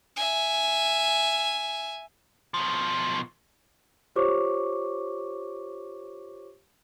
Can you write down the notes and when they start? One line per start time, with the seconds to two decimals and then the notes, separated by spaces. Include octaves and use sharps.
0.16 E5 G#5
2.54 B2 F3
4.16 F4 G4 C5 C#5 C#6 D6